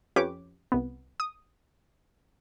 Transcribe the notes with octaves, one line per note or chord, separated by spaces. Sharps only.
F2 C#4 G4 B4 C#5 D6
C2 B3
D#6